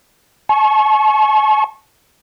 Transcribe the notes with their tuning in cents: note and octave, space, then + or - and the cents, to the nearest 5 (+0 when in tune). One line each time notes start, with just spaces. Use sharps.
A5 -45 C#6 -25